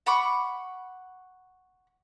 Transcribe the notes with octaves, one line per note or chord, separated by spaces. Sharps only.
F#5 B5 C#6 D6